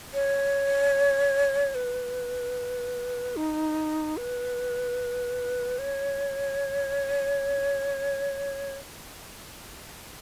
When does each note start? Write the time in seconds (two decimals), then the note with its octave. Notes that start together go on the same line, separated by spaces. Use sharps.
0.14 C#5
1.75 B4
3.36 D#4
4.17 B4
5.79 C#5